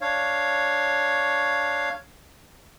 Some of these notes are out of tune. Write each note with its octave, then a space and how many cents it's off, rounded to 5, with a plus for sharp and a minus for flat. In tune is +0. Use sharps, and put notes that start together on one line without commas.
D4 +0 C#5 +0 F5 -5